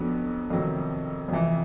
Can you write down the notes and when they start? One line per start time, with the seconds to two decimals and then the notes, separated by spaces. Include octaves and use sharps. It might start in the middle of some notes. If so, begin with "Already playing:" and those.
Already playing: F2 D3 F#3 B3
0.50 F2 C3 D#3 F#3
1.28 F2 C3 E3